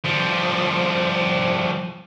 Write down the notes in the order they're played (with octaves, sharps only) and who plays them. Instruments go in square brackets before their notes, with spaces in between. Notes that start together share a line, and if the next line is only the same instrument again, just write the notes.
[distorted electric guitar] F3 G3